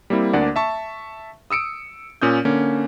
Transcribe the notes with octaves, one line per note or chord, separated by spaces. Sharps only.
G3 A#3 C4 E4
D2 A#3 D4 D5 F#5
E5 A5 C#6
D#6 E6 C#7 D7
A#2 C#4 D#6 G6
D3 A#3 C#4